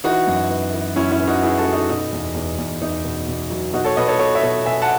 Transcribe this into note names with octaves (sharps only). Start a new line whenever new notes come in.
E3 D#4 F#4
F#2
B3
E3
F#2 C#4 E4
C#4 E4
B3
D#4 F#4
B3 E4 G#4
F#4 A4
B3
D#4 F#4
B2 D#4
E2
E2
E2
E2 D#4
B2
B2
F#3
B2 D#4 F#4
A4 C#5
B2 B4 D#5
A4 C#5
B3 A4 C#5
C#5 E5
B2
B2 E5 G#5
F#5 A5